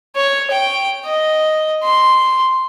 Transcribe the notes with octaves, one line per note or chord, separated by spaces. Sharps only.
C#5
G5
D#5
C6